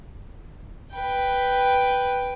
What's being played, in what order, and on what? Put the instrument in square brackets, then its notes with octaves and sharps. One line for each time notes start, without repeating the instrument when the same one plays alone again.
[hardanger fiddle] B4 G5